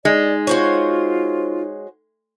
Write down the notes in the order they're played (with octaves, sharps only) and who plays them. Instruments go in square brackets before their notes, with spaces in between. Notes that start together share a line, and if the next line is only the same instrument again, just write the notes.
[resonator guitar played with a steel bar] G#3 [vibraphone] D#4 [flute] D5
[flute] F4 [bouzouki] F#4 C5 C#5